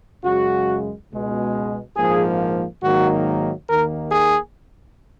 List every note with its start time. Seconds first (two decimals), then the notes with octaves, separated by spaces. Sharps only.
0.23 F#2 C#3 G#3 F#4
1.10 C#2 B2 G#3
1.96 A#1 G#2 F3 A#3 G#4
2.82 G#1 G#2 D#3 F#3 A#3 F#4
3.68 D#2 D#3 A#3 A#4
4.11 G#4